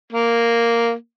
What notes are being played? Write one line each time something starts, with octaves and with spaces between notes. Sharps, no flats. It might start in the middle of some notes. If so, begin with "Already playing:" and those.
A#3